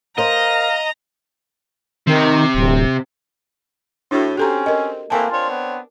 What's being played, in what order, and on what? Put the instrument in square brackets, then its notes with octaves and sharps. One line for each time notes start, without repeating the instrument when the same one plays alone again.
[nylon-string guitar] A#4 C5 [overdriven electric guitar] D#5 [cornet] F5 [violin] A#5
[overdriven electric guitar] C3 [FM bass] D#3
[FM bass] D1
[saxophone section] A2 [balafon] D4 F#4
[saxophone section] C4 [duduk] C#4 [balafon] G4 A4 A#5
[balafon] A#4 D#5
[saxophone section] E3 A3 C4 [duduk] A#3 [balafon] A#4 G#5 A5
[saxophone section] C4 D4 C#5 [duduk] F4
[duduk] B3